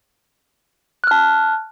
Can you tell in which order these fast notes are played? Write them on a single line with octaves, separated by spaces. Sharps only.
F#6 F6 A5